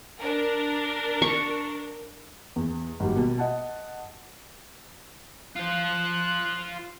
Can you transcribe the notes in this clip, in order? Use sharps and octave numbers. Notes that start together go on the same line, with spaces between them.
D4 A#4
C#6
E2
G#1 F#3 G3
B2
D#5 F#5 A5
F4 C5 F#6